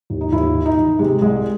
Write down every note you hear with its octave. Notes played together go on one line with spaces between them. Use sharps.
D#2
D#4
D#2 E4
D#3
D#4
D#3
C3 G#3
C2 G#3